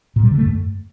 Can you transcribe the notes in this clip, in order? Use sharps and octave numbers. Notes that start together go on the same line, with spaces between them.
A#2
G3
D3
A3
F#2